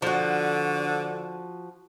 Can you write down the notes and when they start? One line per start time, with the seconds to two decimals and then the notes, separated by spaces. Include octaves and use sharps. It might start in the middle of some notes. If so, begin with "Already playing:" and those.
0.02 D3 F3 F#4